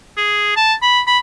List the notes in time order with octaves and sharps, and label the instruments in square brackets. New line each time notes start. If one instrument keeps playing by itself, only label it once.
[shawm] G#4
A5
B5
B5